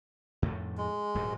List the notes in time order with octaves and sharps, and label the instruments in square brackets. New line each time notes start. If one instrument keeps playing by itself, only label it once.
[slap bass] F2 A2 A3
[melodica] G#3
[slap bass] D#1 G#2 F#3